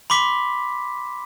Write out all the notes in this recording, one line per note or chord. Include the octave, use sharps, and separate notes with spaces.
B5 C6 D6 B6